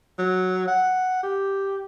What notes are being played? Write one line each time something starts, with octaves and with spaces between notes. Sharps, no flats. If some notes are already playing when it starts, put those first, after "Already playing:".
F#3
F#5
G4